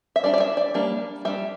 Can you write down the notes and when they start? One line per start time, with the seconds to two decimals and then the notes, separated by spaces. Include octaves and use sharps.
0.16 E5
0.23 G3 D4 D5
0.34 D5
0.40 E5
0.57 D5
0.74 G3 A#3 D4
1.25 G3 D4 E5